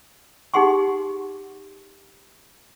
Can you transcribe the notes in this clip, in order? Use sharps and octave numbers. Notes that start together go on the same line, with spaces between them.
D#4 G4 G#4 F#5 C6 C#6